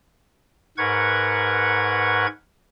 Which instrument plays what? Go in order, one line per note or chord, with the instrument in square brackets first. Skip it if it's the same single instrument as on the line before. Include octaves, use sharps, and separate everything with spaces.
[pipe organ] G#2 A#4 B4 F#5 C#6 G#6